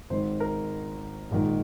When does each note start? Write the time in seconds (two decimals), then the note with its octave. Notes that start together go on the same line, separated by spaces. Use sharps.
0.10 G#1 G#2 D#3 C5
0.40 A#4
1.31 A#1 G#2 D#3